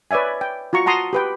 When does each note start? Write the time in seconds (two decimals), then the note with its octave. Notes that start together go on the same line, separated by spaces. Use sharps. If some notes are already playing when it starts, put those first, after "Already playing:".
0.11 B4 C#5 D5 E5 G#5
0.41 G5
0.73 F4 F#4 A#5 C#6
0.86 F#5 A5 A#5 C6 D#6
1.13 G4 B4 G5